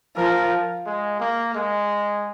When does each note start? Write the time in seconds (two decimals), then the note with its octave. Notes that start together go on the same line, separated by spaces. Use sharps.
0.16 F3 A#4
0.86 G#3
1.20 A#3
1.54 G#3